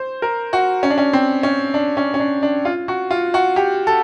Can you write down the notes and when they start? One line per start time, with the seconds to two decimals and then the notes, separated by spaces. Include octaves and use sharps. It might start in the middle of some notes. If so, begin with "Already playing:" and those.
Already playing: C5
0.22 A#4
0.53 F#4
0.83 C#4
0.90 D4
0.98 C#4
1.13 C4
1.43 C#4
1.74 D4
1.97 C#4
2.14 C#4
2.20 D4
2.43 D4
2.65 F4
2.88 F#4
3.11 F4
3.34 F#4
3.56 G4
3.87 A4